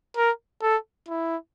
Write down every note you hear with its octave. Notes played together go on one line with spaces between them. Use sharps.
A#4
A4
E4